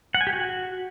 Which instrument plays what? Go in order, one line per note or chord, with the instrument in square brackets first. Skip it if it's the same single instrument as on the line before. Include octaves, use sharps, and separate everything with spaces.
[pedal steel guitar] F#5
G#5
G4
F#4